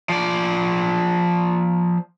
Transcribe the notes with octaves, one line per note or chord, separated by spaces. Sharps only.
F3 D5